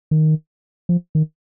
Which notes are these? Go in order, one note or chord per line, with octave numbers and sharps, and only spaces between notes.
D#3
F3
D#3